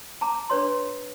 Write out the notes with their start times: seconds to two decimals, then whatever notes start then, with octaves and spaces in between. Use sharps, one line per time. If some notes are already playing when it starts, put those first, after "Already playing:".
0.21 A5 A#5 D6
0.50 D4 B4 C#5 C6